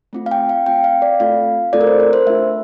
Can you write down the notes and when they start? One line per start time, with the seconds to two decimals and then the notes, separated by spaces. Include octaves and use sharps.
0.13 A3 C4 F4
0.26 F5
0.31 G5
0.49 F5
0.66 A3 C4 F4 G5
0.84 F5
1.02 D5
1.20 A3 C4 F4 A4 F5
1.73 A3 C4 F4 A4 D5
1.81 A#4
1.87 C5
2.00 A#4
2.13 C5
2.27 A3 D4 F4 E5